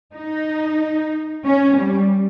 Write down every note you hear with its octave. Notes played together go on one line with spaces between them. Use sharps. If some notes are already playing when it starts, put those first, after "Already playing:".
D#4
C#4
G3